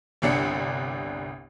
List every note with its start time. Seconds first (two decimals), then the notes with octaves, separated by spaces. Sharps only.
0.22 G1 C2 D4 C#7